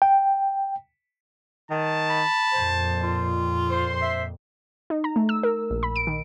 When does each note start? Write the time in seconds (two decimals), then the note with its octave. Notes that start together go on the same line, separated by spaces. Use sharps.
0.02 G5
1.71 D#3 A5
2.09 B5
2.53 F2 A#2 C5
3.03 F4
3.70 C5 C6
4.02 E5
4.90 D#4
5.04 A#5
5.16 A3
5.29 E6
5.43 A#4
5.70 A#1
5.83 B5
5.96 D7
6.07 D#3